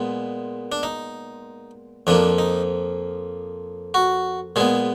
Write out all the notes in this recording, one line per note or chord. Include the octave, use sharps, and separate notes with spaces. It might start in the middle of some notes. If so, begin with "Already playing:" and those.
Already playing: A#2 G#3 B3
D4
D#4
F2 F3 A#3 D4
D#4
F#4
A#2 G#3 B3 G#4